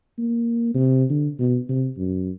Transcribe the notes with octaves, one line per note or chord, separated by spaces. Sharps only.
A#3
C3
D3
B2
C3
F#2